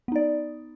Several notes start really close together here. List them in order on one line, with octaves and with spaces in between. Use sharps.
B3 D#4 D5